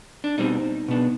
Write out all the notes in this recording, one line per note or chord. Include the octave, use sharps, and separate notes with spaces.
D4
B2 G3 C4 D#4
B2 B3 D4